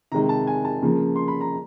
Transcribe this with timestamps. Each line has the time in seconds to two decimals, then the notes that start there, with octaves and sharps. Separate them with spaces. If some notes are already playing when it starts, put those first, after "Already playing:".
0.12 C3 D#3 G#3 A#5
0.29 A5
0.47 G#5
0.65 A5
0.82 C#3 F3 A#3
1.16 C6
1.28 B5
1.41 A#5